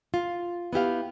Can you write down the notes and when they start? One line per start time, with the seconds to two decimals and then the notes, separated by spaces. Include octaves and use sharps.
0.14 F4
0.73 B3 E4 G4 F5